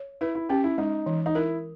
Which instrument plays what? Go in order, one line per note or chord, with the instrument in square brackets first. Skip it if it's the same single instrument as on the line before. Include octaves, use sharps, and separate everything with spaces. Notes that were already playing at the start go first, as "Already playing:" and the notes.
Already playing: [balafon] C#5
[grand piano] E4 [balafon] B4
[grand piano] E4
[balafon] C#4 [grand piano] G4
[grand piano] E4
[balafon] G#3 [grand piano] D#4
[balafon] E3
[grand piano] D#4
[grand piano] E4 [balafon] A#4